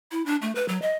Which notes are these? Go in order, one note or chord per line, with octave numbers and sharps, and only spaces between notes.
E4
D4
A3
B4
F#3
D#5